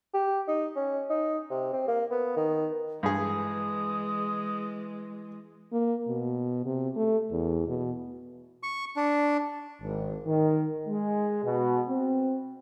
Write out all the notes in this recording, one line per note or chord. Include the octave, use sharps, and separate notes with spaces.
G4
D#4
C#4
D#4
C3
C4
A#3
B3
D#3
G2 E3 G#3 G#4 D#6
A#3
B2
C3
A3
E2
B2
C#6
D4
G#1
D#3
G#3
B2
C4